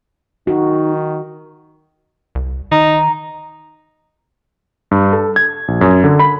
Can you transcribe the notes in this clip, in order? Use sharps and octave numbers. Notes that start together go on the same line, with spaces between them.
D#3 D#4 F#4
C2
D#3 D#4 A#5
G2
A4
G#6
A#1
F#2
D3
B5